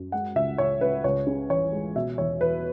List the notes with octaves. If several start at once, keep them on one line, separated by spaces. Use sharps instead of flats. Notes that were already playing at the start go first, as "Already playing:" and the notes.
Already playing: F#2
G#3 F#5
C#2 E5
C#2 C#5
C#2 B4
C#2 C#5
C#3
E3 C#5
G#3
B2 E5
E2 C#5
E2 B4